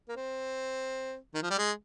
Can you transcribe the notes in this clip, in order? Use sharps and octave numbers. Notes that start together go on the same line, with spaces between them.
A#3
C4
D#3
F3
G3
G#3